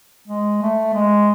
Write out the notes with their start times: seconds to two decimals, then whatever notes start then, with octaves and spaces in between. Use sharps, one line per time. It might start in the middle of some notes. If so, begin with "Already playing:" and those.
0.28 G#3
0.62 A3
0.94 G#3